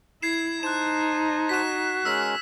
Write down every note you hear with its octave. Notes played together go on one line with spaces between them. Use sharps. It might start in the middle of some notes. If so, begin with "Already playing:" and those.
E4 G#6 C7 E7
D#4 C5 A5 F#6 E7
F#4 B6 E7
G#3 C#4 A#4 E6 B6